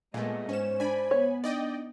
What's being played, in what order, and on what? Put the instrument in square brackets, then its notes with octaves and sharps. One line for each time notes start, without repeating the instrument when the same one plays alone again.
[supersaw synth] A#2 A3 [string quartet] G#3 B3 D#5 [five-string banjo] G#4
[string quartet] G#2 [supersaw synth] C#4 E7 [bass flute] C5
[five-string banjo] D4 [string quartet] D5 [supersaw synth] G#5 B5
[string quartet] B3 [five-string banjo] C#5
[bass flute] D4 [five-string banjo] D#4 [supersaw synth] D5 D#5 G5